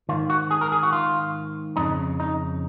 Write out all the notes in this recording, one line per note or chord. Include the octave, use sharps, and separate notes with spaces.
G#2 D#3 F4
F#4
G#4
A#4
G#4
F#4
F4
F2 C#3 D#4
D#4